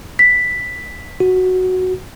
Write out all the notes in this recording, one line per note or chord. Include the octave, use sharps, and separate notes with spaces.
B6
F#4